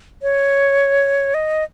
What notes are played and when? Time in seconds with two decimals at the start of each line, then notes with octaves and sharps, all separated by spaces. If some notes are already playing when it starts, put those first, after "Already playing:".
0.22 C#5
1.34 D#5